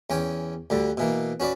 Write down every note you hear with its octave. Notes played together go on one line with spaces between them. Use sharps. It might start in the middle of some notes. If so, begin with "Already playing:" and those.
E2 C#4 G5 G#5
D2 D3 G3
B2 E3 A#3
C#4 F#4 B4 D5